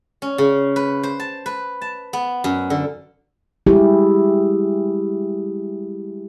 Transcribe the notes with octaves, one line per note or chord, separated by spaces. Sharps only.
C#4
C#3
B4
C5
A5
B4
A5
B3
F#2
D3
G3 G#3 E4 G4 G#4